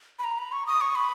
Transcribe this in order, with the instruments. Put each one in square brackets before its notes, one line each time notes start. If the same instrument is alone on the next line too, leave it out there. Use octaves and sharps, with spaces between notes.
[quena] B5
A#5
B5
C#6
D#6
C#6
B5